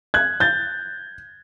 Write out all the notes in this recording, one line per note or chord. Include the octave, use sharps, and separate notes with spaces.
F#6 G#6
G6 A6